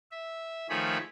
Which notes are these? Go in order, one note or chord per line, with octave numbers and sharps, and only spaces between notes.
E5
D#3 F3 A3 G#4 C#5 B5